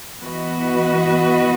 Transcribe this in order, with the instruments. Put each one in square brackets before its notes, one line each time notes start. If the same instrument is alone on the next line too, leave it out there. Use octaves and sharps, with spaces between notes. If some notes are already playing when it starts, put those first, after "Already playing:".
[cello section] E3 B3 F#4 B4 D#5